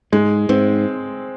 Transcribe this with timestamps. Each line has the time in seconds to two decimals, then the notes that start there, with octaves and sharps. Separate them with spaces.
0.12 G#2 G#3
0.49 G#2 C4